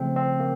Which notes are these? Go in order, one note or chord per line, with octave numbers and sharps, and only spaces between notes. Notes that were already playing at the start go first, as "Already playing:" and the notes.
Already playing: C#3 F3 A3 C4
C4
A#3